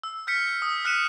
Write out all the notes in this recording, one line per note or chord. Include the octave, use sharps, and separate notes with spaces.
E6
F6 G6 B6 C#7
D#6
F6 F#6 B6 C#7 D#7 E7